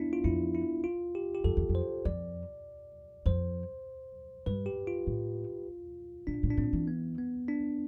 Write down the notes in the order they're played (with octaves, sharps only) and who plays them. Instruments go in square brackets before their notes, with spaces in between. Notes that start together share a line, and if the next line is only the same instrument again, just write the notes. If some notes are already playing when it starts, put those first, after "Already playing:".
Already playing: [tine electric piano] B3 D4 E4
F4
[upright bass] F2 [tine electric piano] E4
[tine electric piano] E4
F4
G4
G4
[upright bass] F2 [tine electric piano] A4
[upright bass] E2
F2
[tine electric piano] C5
[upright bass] F2 [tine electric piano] D5
[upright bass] F2 [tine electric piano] C5
[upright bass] G2 [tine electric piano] B4
[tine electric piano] G4
F4
[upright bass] A2
[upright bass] B2 [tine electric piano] D4
[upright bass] A2
[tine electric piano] D4
[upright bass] A2 [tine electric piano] C4
[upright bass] E3
[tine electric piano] B3
B3
D4